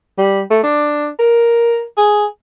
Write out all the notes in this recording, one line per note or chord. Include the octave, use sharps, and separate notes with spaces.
G3
A3
D4
A#4
G#4